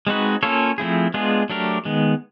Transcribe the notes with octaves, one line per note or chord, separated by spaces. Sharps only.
G#3 C4 D#4 F#4 B4
A#3 C#4 F4 A4 C#5
F3 A3 C4 E4 G#4
G#3 B3 D4 F4 G#4
F#3 A3 D4 G4 A#4
D#3 G#3 B3